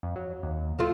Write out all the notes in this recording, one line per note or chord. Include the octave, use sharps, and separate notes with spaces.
F2
F#3
D#2
F3 A3 F4